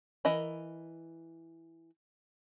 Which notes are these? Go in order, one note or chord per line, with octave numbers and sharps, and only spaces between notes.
E3 A#4 D#5 B5